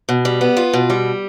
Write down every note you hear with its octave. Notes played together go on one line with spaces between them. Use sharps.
B2
G3
B3
F4
B2
G3